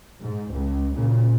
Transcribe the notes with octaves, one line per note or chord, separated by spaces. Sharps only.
G#2
C#2
A#2 C#3